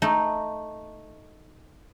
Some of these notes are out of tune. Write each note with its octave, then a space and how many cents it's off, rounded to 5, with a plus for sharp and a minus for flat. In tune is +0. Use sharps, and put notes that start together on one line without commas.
A3 +5 D#4 +0